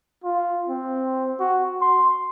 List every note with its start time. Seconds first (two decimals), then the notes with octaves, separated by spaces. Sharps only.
0.24 F4
0.69 C4
1.40 F#4
1.82 C6